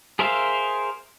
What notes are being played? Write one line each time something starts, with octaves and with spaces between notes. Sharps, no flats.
G#4 A#4 C5 E5 F5